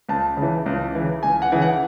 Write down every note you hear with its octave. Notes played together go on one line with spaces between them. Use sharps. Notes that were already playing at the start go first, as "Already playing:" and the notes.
C#2 A5
C#3
E3
C#2
C#3 E3
C#2 G#5
F#5
C#3 E3
F#5